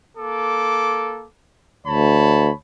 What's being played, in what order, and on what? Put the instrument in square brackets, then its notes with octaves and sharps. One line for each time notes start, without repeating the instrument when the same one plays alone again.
[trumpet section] A#3 A4 D6
[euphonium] D2 [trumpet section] C#5 A5 B5